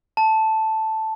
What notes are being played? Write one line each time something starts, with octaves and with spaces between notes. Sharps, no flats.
A5